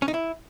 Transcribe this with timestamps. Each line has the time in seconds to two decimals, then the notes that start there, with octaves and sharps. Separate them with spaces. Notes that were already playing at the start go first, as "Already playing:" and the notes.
0.02 C#4
0.08 D#4
0.14 E4